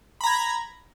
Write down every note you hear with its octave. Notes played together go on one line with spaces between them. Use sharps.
A#5 B5 G#6